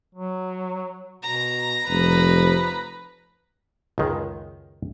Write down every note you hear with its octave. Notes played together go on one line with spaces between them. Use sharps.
F#3
B2 A#5
F1 F3 B4
C#2 F#2 D#3 G#3